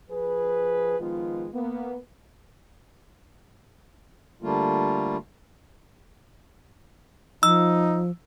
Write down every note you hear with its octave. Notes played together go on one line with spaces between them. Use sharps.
F3 G#4 B4
D#3 F3 G#3 B3 F4
A#3 B3
D3 G3 A3 A#3 F4
F3 D#4 E6